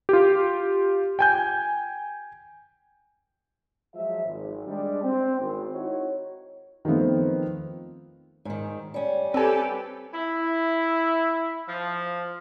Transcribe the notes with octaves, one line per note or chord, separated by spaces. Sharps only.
F4 G4
G5 G#5 G6
F3 F#3 G#3 E5
G#1
G3 G#3 D4
C4
G#1
D#4 E4 F#4 C#5
D#3 F3 A3 B3 C4
G#2 D#3
G3 C#4
C4 G4 A4 B4 G#5
E4
F3